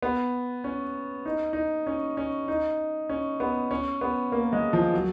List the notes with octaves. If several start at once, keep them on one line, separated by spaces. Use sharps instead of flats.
B3
C#4
D#4
D#4
C#4
C#4
D#4
C#4
B3
C#4
B3
A#3
G#3
F3
F#3